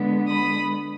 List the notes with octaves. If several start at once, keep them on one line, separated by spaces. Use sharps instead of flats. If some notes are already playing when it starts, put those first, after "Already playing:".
Already playing: D3 G#3 B3
B5 D#6